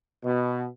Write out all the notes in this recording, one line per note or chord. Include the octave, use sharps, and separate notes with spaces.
B2